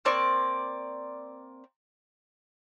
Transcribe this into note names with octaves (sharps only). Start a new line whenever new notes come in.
A#3 C4 D5 C#6